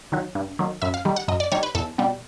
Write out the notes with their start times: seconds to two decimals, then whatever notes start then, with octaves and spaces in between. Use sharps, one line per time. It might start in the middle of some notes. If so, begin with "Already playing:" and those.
0.12 D#3 F#3
0.35 G2
0.59 D#3 F#3
0.82 F#2 E5
0.94 F5
1.05 D#3 G3
1.16 F#5
1.28 F#2 D#5
1.40 D5
1.52 D#3 G3 C#5
1.63 B4
1.75 E2 A4
1.98 B2 G3